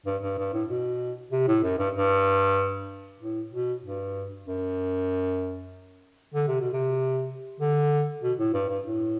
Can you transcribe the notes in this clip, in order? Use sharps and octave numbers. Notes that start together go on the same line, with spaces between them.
G2
G2
G2
A2
B2
C3
A2
F#2
G2
G2
A2
B2
G2
F#2
D3
C3
B2
C3
D3
B2
A2
G2
G2
A2